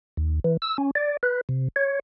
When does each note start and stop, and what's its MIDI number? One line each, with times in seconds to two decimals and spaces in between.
0.17 0.39 39
0.44 0.57 52
0.62 0.77 88
0.78 0.91 61
0.95 1.17 74
1.23 1.41 71
1.49 1.68 48
1.76 1.99 73